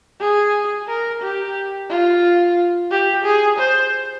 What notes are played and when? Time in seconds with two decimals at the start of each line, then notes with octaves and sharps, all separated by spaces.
0.20 G#4
0.88 A#4
1.21 G4
1.89 F4
2.91 G4
3.24 G#4
3.58 C5